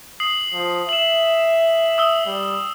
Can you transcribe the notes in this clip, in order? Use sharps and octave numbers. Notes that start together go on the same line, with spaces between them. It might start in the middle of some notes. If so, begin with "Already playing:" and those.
D#6 C7 F#7
F3
E5 E7 F#7
D#6 E6 G7
G3